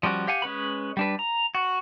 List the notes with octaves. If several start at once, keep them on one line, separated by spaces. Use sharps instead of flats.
F3 G3 C#4 F#4
G4 F5 F#5 G#5
G#3 C#4 B4 B5
G3 D4 B4
A#5
F#4